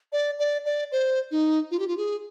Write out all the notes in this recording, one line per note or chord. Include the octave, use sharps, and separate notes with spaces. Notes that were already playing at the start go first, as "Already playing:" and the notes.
D5
D5
D5
C5
D#4
F4
G4
F4
G#4